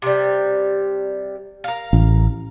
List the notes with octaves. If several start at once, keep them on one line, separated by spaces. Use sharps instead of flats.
C3 G3
A#4 F5
A1